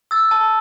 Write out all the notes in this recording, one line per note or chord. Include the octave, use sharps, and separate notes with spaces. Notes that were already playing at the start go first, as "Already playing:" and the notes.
E6 A6
A5